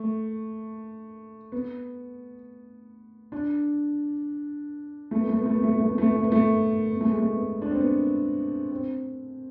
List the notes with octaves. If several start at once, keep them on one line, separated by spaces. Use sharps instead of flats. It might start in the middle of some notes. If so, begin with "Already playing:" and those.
Already playing: A3
B3
D4
A3
B3
A3
B3
A3
B3
A3
B3
A3
B3
A3
B3
A3
B3
A3
B3
A3
G#3
A3
B3
D4
C4
B3
C4